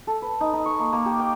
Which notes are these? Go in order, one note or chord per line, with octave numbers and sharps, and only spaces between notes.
A4
B4
D#4
D#4
C#6
A#3
A#3
G4
G5